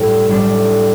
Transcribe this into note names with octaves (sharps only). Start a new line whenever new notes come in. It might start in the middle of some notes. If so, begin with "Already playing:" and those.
Already playing: A2 G3 D4
A2 G3 D4